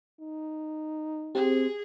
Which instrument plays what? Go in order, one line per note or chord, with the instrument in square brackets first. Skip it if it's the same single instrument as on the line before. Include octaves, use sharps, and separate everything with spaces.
[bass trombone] D#4
[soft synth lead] C4 [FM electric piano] G4 [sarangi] G#4